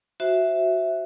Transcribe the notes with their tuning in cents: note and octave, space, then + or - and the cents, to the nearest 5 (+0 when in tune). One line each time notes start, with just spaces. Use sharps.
F#4 +0 C5 +0 E5 +0